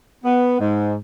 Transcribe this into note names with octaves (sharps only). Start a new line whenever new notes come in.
B3
G#2